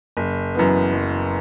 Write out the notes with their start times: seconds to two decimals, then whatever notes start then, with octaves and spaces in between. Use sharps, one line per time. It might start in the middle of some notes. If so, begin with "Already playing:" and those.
0.17 F#1
0.55 F#2 E3 B3
0.93 F#1